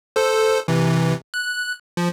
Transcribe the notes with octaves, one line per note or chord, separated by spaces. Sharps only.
A4 C5
C3 E3
F#6
F3